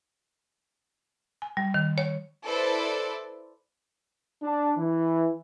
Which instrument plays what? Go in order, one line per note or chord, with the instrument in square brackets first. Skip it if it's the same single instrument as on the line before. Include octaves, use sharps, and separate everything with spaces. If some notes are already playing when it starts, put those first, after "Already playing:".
[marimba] G#5
G3
D#3
C#5
[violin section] E4 A4 B4 C5 D5
[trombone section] D4
E3